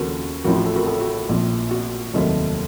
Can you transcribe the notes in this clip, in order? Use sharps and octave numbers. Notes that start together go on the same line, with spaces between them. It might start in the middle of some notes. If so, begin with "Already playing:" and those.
Already playing: D#2 C#3 F3 F#4 A4 A#4
A1 A2 F3 F#4 A#4
F#4
A4
F#4 A#4
A4
F#4
A#1 A#2 F3
F#4
F1 D#2 D#3 F#3 A3